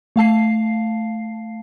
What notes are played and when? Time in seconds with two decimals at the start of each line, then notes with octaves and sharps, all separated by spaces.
0.16 A3 F5 A5 C7